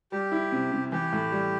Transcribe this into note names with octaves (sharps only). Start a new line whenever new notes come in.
G3 G4
E4
C3
C3
E3 G4
A2
G3